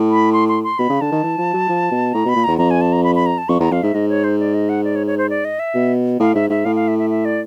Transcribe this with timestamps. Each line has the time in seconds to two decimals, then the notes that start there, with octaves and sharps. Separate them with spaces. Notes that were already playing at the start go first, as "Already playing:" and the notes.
Already playing: A2
0.11 B5
0.33 C6
0.48 C6
0.64 C6
0.79 B2 B5
0.89 C#3
1.01 D3 A5
1.12 D#3
1.24 E3
1.38 F3
1.54 F#3
1.69 F3
1.91 B2
2.14 A2 A#5
2.25 B2 B5
2.36 A#2
2.44 E2 A#5
2.58 F2 A#5
2.71 G#5
2.81 A5
2.93 A#5
3.04 B5
3.15 B5
3.26 A#5
3.38 A5
3.49 F2 C#6
3.60 E2 A#5
3.71 F2 F5
3.83 G#2 E5
3.94 G#2 D#5
4.09 C#5
4.24 C5
4.39 D5
4.54 D#5
4.69 F#5
4.84 D5
4.96 C#5
5.07 C#5
5.18 C5
5.30 D5
5.45 D#5
5.59 E5
5.75 B2
6.20 A2 F5
6.35 G#2 E5
6.50 G#2 E5
6.65 A2 F5
6.76 F5
6.88 E5
6.99 E5
7.10 E5
7.25 D5